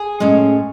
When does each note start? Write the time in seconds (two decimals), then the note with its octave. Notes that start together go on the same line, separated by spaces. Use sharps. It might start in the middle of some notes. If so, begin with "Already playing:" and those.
Already playing: G#4 G#5
0.20 A2 G#3 C#4